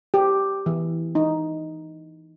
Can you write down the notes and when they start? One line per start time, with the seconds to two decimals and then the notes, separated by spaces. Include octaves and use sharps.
0.14 G4
0.66 E3
1.15 D#4